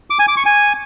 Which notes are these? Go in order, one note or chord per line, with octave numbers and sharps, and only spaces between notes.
D6
G#5
D6
C#6
G#5